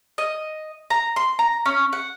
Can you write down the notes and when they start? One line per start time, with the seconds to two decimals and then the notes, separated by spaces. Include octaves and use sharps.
0.18 D#5
0.90 A#5
1.16 C6
1.39 A#5
1.66 C#4
1.93 F#5